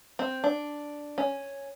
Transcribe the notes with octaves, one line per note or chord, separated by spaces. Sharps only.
C4
D4
C#4